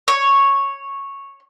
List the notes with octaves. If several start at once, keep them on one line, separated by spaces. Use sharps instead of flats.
C#5